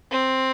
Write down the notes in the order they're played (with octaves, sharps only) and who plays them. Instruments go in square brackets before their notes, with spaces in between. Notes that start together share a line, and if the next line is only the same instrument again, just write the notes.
[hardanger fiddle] C4